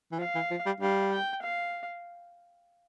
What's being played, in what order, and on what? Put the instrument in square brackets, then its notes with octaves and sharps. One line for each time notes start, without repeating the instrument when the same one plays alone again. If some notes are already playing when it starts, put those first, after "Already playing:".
[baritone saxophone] E3
[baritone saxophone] F3 [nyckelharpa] F5
[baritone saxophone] E3
F3
G3
[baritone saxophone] G3 [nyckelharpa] F5
[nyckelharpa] G5
F5